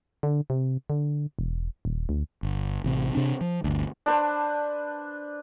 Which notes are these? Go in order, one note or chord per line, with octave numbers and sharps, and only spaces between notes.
D3
C3
D3
E1
D#1
D2
G1
A1 C3
C3 C4 D4
F3
G1 D2
D4 B4 C5